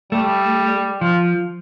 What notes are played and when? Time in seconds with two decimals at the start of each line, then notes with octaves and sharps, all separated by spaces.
0.12 G3 A3
1.01 F3 F4